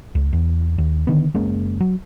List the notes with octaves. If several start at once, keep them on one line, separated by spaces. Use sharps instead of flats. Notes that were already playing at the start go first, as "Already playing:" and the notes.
C#2
E2
D#2
D3 D#3 B3
F#1 G#3 A#3 C#4
F#3